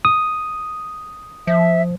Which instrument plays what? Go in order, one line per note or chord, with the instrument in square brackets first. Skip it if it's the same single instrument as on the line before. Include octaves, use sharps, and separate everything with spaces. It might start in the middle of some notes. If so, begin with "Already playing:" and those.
[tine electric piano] D#6
[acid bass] F3 [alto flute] E5